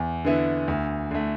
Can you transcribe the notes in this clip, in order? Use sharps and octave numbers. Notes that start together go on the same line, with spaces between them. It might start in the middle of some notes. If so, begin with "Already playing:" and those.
Already playing: E2
D3 B3 E4
D2
D3 A3